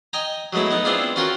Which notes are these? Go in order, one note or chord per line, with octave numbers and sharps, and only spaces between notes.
D#5 G5 G#5 A#5
F#3 G#3 A3 B3 E4
B3 D#4
B3 C4 D4 E4 F4 G#4
C#4 F4 F#4 A#4 G5